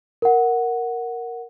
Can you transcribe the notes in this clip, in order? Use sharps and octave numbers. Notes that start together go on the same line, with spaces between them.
A#4 F#5